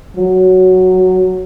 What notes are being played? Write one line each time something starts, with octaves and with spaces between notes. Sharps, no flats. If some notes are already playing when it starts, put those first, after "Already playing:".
F#3